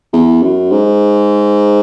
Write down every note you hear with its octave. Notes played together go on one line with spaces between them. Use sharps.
E2
F#2
G#2